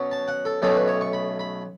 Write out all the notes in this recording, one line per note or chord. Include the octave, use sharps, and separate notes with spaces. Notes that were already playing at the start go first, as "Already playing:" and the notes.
Already playing: B2 F#3 C#4
A5
F#5
A4
B1 B2 A3 C#4 A4
B4
C#5
C#6
B5
B5